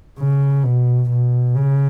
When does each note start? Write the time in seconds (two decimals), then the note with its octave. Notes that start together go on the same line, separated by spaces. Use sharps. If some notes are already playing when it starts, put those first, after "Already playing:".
0.19 C#3
0.64 B2
1.10 B2
1.55 C#3